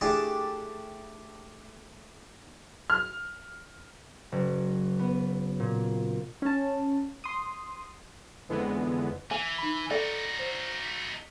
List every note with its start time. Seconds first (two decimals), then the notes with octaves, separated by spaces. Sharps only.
0.01 A3 D4 E4 G4 G#4
2.90 F6
4.32 F#1
4.99 B3
5.60 A#2
6.42 C#4 A5
7.24 C6 D#6
8.49 F2 D3 E3 G#3 B3
9.31 E3 G#5
9.58 D#4 B5
9.91 D#4 F#4 A4 D5
10.39 C5
10.85 B6